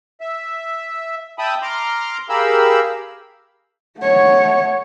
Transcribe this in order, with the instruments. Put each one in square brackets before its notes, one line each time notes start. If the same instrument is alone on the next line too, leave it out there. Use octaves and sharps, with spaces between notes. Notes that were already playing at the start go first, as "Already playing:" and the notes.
[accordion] E5
E5 G5 A5 B5 D#6
A#5 C6 D6 F6
G4 G#4 A#4 F5 B5 E6
[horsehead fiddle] A3 C#5 [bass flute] F#5